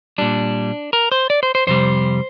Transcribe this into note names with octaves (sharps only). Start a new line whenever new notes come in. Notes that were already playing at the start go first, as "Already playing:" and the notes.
A#2 G3 D4
A#4
C5
D5
C5
C5
F2 C3 G3 C5